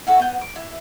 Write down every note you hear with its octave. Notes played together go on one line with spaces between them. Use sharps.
E4 F#4 A4
B3 G6
D6
E4